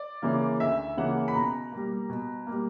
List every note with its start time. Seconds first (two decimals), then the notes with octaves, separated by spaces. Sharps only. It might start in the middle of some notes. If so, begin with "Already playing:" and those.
Already playing: D5
0.22 C#3 E3 A#3
0.60 D2 E5
0.97 C#3 E3 A#3 F#5
1.28 B5
1.35 B2 A#5
1.72 G3 A#3
2.10 B2
2.47 G3 A#3